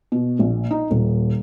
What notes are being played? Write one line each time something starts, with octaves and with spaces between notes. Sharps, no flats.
B2
A#1
D#4
D#1